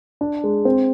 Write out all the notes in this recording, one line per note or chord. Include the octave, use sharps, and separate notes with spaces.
D4
G#3
C4